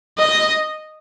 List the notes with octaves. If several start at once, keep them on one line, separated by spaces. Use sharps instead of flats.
D#5